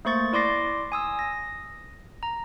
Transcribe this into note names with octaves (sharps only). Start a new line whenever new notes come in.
A3 A#3 C5 C#6 A6
E4 D5 C6 D6 A#6 C7
G#5 D#6 E6
A#6
A#5